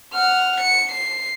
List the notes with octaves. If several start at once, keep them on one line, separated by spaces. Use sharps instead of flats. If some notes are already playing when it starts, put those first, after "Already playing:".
F#5 F6
C#7
C7